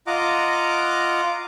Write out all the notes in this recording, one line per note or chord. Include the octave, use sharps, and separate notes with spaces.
F4 D#5 F#5 A#5 D6